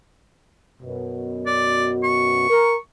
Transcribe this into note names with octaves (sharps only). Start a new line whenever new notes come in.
F#2 B2
D5
C#6
A#4